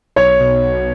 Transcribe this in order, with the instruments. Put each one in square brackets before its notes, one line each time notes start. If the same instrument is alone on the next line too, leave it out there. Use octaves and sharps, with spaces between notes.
[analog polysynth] B1 [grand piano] C#5
[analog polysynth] B2
B1